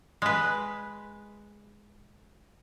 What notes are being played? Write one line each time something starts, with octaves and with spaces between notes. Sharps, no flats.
G#3 B4